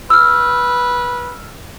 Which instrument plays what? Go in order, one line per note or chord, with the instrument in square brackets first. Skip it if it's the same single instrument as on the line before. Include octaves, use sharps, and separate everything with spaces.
[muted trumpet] B4 [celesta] E6 F6